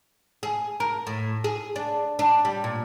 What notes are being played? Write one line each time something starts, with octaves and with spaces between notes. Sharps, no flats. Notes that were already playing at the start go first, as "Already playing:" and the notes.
G#4
A#4
A2
G#4
D4
D4
G3
A#2